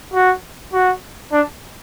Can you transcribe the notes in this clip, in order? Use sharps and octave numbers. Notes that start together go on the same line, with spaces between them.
F#4
F#4
D4